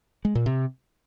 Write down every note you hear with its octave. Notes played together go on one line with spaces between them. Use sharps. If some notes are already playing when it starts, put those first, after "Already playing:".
G#3
A#2
C3